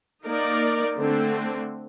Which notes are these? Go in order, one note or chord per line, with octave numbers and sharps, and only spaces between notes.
A#3 D#4 A#4 D5
D3 A3 C4